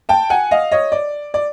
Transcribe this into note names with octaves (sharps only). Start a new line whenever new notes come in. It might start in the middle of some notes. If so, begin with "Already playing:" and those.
G5 A5
F#5 G#5
D#5 F5
C#5 D#5
D5
D5